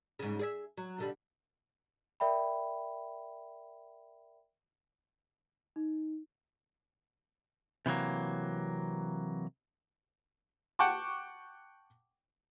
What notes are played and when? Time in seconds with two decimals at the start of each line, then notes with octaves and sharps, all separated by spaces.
0.19 G#2 C#3
0.39 G#4 D5 E5
0.78 F#3
0.98 B2 D3 G3
2.20 A#4 D5 E5 G5 B5
5.76 D#4
7.86 C3 E3 F#3 A#3
10.79 F#5 G5 A5 C#6 D6